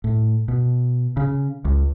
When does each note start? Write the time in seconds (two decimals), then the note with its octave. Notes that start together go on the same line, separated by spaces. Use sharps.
0.04 A2
0.48 B2
1.17 C#3
1.65 C#2